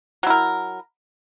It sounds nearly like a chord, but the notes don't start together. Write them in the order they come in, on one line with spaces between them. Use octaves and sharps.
F#3 E4 A#4